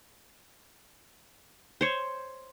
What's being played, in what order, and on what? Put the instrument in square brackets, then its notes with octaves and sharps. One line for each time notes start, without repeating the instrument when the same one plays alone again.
[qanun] C5 C#5